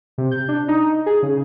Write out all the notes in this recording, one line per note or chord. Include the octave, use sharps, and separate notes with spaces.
C3
G6
D4
D#4
G#4
C#3